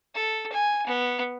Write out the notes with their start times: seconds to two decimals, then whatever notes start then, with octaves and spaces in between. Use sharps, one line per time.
0.15 A4
0.53 G#5
0.87 B3